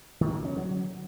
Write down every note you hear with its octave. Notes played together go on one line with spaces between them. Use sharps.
D#3
D3
C#4
F#3